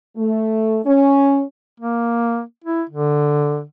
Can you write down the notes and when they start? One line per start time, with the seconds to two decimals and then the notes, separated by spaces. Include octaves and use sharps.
0.17 A3
0.86 C#4
1.80 A#3
2.64 E4
2.89 D3